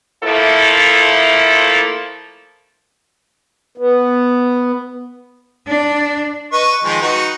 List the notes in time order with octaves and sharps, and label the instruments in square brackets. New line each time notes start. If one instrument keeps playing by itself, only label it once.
[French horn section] F3 A3 A#3 E4 A4
[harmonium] B3
[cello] D4
[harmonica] B4 D#5 C#6
D#3 F3 G#3
D#4 F#4 B4